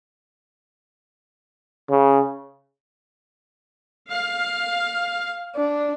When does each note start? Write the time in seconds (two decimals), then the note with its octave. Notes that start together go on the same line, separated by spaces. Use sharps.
1.90 C#3
4.10 F5
5.56 D4